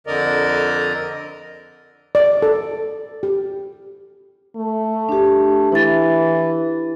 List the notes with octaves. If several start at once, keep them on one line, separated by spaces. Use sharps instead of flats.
F2 D3 A#4 D5 D#5
D5
A4
G4
A3
D4 G4
E3 E4 A6